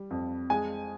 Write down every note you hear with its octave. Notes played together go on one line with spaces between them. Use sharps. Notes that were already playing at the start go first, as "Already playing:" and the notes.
Already playing: G3
F2
G#3 G#5